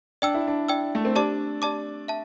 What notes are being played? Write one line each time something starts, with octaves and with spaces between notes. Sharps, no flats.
D4 D5 G5 E6
E4
D4
D5 G5 E6
A3
C4
D4 G4 D5 A5 D6
G4 D5 A5 D6
E5 A5